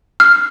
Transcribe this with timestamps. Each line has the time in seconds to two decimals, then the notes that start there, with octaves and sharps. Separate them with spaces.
0.20 F6